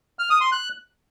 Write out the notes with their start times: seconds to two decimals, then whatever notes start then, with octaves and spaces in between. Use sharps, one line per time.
0.19 F6
0.30 D#6
0.41 C6
0.52 F#6